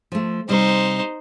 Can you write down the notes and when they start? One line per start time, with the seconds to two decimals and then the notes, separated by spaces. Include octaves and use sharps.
0.12 F3 A3
0.49 C3 G3 D#4 C5